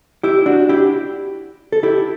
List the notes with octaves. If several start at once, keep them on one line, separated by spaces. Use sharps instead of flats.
E4 G4
D4 F#4
E4 G4
A4
E4 G4